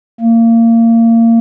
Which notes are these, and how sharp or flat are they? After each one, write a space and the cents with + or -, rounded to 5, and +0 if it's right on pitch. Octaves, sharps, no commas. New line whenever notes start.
A#3 -25